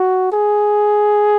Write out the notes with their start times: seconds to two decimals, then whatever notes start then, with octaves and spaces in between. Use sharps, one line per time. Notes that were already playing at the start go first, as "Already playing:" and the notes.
Already playing: F#4
0.32 G#4